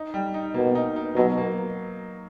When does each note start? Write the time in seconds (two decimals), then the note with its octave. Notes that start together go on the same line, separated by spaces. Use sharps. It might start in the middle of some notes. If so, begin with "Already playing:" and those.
Already playing: D#4
0.14 G3
0.34 D#4
0.54 B2 A#3
0.75 D#4
0.96 D#4
1.16 B2 F#3
1.38 A#3